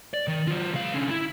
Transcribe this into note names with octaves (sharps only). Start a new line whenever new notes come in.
D5
D#3
F#3 F4
C#2 F5
D3 C#4
E4